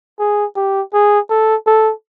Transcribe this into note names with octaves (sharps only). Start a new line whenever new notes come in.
G#4
G4
G#4
A4
A4